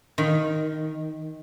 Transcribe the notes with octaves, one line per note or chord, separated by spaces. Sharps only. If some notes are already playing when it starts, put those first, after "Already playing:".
D#3